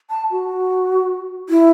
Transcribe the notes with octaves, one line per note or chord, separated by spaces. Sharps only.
A5
F#4
E4